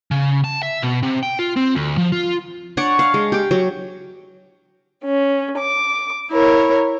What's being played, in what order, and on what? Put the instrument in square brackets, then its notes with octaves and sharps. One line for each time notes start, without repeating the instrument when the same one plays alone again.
[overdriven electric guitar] C#3
A5
E5
B2
C3
G5
F4
C4
D2
F3
F4
[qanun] D4 C#5 D5 F#5
F5
G#3
G4 D6
F#3
[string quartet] C#4
D6
E4 A#4 C#5